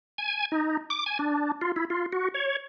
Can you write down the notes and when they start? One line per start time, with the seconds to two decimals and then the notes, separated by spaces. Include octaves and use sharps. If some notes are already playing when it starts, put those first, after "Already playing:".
0.18 G#5
0.52 D#4
0.90 D6
1.06 G#5
1.19 D4
1.61 F4
1.76 E4
1.90 F4
2.12 F#4
2.34 C#5